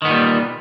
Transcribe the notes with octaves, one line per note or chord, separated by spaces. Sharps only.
A#2 D#3 G3 B3